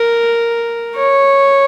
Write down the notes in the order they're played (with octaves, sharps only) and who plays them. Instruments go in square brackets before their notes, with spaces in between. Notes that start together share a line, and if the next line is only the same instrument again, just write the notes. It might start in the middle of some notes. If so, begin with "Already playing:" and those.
Already playing: [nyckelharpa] A#4
C#5